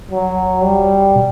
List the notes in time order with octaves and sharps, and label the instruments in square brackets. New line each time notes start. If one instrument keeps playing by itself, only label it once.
[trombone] F#3
G3
[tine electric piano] B2